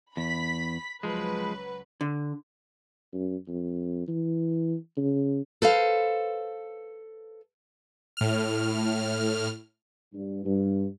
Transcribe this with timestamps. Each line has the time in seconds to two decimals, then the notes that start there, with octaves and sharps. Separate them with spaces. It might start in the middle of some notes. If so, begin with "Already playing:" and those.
0.17 E2 B5 B6
1.03 C#2 F3 F#3 G#3 B4
2.01 D3
3.13 F#2
3.48 F2
4.08 E3
4.97 C#3
5.62 A4 B4 C5 F5
8.17 A2 F6
10.14 G2
10.45 G2